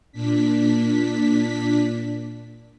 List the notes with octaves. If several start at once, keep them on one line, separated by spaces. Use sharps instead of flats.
A#2 D4 B6